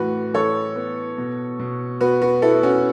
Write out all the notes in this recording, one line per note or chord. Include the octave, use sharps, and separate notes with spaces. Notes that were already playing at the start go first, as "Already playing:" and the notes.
Already playing: A2 E3 F#4 B4
E3 A4 C#5
B3
B2
B2
B3 F#4 B4
F#4 B4
B3 E4 A4
C#4 F#4